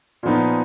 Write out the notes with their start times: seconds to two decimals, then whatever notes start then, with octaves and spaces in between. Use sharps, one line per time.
0.23 A#2 F3 B3 D#4